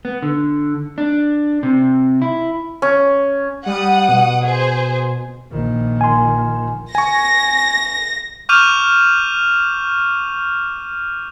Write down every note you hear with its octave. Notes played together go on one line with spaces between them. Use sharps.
B3
D3
D4
C3
E4
C#4
G3 F#5 D#6
B2
G#4 C5
A#1 D#3
G#5 C6
G#5 C#6 A#6
C#6 D6 F6 G6 D#7 F7